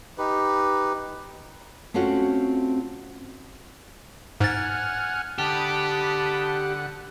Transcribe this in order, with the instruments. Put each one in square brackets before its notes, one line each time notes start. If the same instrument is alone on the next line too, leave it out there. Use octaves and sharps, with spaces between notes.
[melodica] D#4 G4 B4
[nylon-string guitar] A3 C4 C#4 F4 F#4
[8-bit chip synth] G#2 A6 [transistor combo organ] F#5 G#5 F6
[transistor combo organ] D3 F#5 [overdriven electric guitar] G4 [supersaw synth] A5 B5 D#6